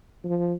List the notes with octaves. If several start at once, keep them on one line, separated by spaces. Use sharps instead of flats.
F3